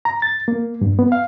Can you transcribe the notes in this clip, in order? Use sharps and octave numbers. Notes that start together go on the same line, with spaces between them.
A#5
A6
A#3
G2
B3
F5